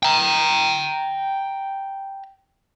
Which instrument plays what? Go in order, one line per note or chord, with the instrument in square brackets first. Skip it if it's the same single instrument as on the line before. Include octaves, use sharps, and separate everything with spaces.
[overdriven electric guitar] G5 A#5